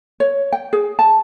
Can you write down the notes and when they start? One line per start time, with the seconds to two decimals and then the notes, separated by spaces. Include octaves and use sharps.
0.20 C#5
0.52 G5
0.73 G#4
0.99 A5